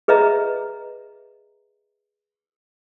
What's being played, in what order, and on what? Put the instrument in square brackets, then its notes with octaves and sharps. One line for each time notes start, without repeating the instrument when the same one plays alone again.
[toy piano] G#4 B4 D#5 E5 A#5